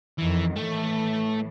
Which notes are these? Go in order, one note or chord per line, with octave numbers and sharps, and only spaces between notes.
F2 D#3 E3
A2 E3 A3